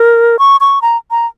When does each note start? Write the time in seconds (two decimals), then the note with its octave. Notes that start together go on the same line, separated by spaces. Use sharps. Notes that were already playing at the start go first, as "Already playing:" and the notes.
Already playing: A#4
0.39 C#6
0.61 C#6
0.82 A#5
1.11 A#5